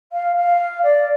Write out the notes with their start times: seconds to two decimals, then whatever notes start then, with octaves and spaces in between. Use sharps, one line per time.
0.12 F5
0.36 F5
0.83 D5